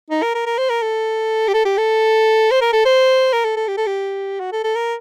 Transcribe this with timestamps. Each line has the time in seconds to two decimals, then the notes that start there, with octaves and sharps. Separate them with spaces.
0.10 D#4
0.22 A#4
0.34 A#4
0.46 A#4
0.58 C5
0.70 A#4
0.82 A4
1.48 G4
1.54 A4
1.65 G4
1.78 A4
2.51 C5
2.61 A#4
2.73 A4
2.85 C5
3.33 A#4
3.45 A4
3.56 A4
3.68 G4
3.77 A4
3.86 G4
4.40 F#4
4.52 A4
4.64 A4
4.76 A#4